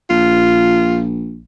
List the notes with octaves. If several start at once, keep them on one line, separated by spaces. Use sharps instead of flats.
A#1 F4